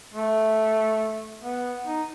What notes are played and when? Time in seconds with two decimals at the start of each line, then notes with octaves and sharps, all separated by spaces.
0.14 A3
1.43 B3
1.85 D#4